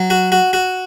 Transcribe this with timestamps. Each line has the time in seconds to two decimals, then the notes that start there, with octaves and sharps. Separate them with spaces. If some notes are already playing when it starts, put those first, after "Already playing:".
Already playing: F#3
0.10 F#4
0.32 F#4
0.53 F#4